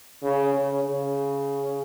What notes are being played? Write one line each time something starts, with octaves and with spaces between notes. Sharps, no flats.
C#3
C#3
C#3